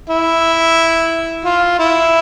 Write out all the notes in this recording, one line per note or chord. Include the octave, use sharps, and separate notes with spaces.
E4
F4
E4